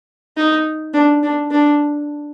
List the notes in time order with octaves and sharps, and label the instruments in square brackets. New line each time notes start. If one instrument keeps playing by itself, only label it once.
[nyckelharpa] D#4
D4
D4
D4